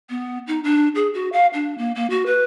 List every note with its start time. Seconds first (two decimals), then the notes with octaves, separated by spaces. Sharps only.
0.10 B3
0.47 D#4
0.64 D4
0.95 G#4
1.14 F#4
1.33 F5
1.53 D4
1.78 A#3
1.95 A#3
2.10 F#4
2.26 B4